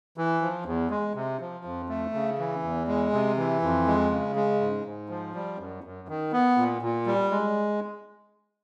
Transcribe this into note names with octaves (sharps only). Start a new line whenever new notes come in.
E3
F3
E2
G#3
C3
F3
F2
A3
C#3
E3
E2
G#3
C3
E3
F2
G#3
C#3
G#3
G#2
G#2
F3
G3
F#2
F#2
D#3
B3
A#2
A#2
G3
G#3